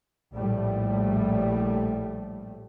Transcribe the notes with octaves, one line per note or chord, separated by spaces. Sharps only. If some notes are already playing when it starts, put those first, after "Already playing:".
A#1 A2 G3 A3